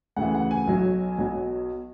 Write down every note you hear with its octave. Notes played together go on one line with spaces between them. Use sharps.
D2 C#3 E3 F#5
F#5
G#5
B1 B2 F#3
B1 B2 F#3